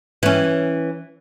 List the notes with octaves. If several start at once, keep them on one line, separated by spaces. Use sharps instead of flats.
E3 C#4